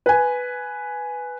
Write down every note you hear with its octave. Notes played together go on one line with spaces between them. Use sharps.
B4 G#5